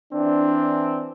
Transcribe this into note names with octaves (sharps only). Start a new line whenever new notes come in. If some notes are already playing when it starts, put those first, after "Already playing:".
E3 C4 D4